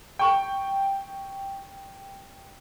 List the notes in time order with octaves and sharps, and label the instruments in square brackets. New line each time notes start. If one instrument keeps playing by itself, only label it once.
[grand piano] G5 C#6